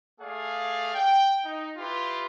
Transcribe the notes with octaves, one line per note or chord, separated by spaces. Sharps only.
A3 G#4 D5 F5
G5
D#4
E4 F4 G4 B4